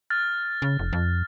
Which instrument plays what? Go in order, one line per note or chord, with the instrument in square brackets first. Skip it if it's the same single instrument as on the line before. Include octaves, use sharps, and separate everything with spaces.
[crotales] F6 F#6 A6
[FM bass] C#3
F1
F2